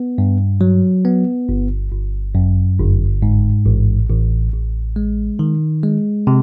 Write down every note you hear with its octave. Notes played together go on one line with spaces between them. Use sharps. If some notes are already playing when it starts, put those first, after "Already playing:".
Already playing: B3
G2
F#3
B3
G1
G1
F#2
G1
G#2
A1
A1
A1
G#3
D#3
G#3
C3